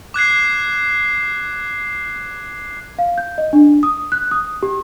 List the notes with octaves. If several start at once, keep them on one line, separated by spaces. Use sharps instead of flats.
D6 F#6 G#6 C7
F5
G6
D#5
D4
D#6
F#6
D#6
G4